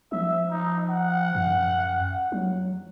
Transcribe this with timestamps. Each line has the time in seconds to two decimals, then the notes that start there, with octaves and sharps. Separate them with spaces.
0.12 F3 E5
0.51 D#4
0.90 F#5
1.35 F#2
2.32 F#3